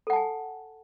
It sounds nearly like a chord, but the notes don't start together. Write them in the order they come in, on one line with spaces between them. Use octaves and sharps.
A4 F#5 A5 G#5